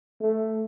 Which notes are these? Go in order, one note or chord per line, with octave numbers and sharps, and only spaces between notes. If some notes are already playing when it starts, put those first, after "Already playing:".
A3